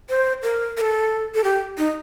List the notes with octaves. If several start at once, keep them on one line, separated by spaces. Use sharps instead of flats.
C5
A#4
A#4
A4
A4
G4
D#4